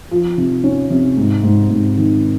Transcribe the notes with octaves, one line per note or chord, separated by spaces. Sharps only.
F3
C3
C#4
C3
G#2
G#2
G#2
D#3